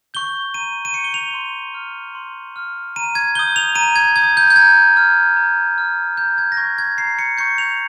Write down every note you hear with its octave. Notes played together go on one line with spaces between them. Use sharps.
C#6 G6 G7
A#5 D#7
D#7
C#6 G6 C#7
G7
F7
C6
F6
C6
F6
A#5 D#7
G#6
D#6 G6 G7
F7
A#5 D#7
G#6
D#6 G6 G#6
G6
G6
A#5 G#6
F6
A#5
F6
A#5 G6
G#6
A#6
C#6 G6 G#6
G#6
A#5 C7
C#7
C#6 G6 C#7
F7